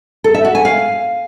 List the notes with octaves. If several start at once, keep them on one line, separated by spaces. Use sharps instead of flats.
A4
E5
F#4
G#5
F5